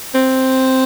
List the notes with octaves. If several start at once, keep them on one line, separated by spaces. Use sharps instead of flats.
C4